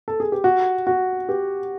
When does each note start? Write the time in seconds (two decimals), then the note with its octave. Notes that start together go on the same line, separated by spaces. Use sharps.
0.08 A4
0.20 G#4
0.32 G4
0.44 F#4
0.87 F#4
1.29 G4